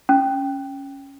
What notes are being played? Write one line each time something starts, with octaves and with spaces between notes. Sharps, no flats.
C#4